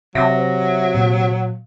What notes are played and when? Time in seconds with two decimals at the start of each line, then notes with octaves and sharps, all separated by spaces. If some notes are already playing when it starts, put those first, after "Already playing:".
0.15 C3 F#3 E5 A#6
0.95 A#2